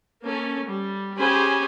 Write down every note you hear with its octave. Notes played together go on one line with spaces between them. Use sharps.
A#3 C#4 A4
G3
C#4 G4 G#4 C5 G#5 B5